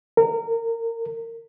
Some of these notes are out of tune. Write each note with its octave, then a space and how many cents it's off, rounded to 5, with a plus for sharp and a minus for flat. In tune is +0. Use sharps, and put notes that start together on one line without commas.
A#4 -25